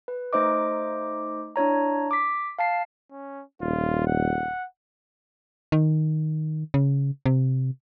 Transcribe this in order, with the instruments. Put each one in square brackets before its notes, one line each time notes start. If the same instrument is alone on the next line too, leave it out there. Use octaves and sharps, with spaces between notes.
[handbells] B4
A3 D#4 C5 D#5 D6
D4 E4 C#5 A#5
D6 B6
F5 A5 C7
[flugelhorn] C#4
[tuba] D#1 [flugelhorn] F4
[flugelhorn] F#5
[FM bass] D#3
C#3
C3